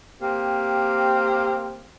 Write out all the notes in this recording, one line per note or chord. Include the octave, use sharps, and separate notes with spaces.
A#3 C4 G4